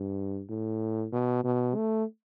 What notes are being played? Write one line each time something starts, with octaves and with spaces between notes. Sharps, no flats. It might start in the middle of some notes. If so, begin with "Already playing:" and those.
Already playing: G2
A2
B2
B2
A3